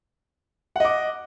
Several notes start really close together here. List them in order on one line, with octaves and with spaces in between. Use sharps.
F#5 D#5 D6